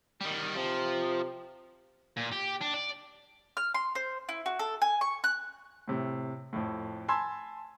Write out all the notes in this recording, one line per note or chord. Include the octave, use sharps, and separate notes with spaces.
D#3 G3
C3 F3
A#2
G4
D4
D5
F6
C6
C5
E4
F#4
A4
G#5
C#6
F#6
A2 C3
F2 A2
G#5 A5 B5 C6 E6 G#6